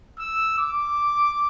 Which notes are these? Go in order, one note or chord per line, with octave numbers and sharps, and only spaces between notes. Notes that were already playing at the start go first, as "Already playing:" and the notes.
E6
D6